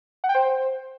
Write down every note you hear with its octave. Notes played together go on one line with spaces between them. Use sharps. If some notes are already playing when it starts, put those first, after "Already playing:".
F#5
G5
C5